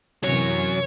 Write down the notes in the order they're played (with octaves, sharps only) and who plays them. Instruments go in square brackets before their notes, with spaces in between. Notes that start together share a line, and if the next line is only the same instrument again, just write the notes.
[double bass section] F#2 C3 E3 [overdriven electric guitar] F#3 C#4 [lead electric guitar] C#5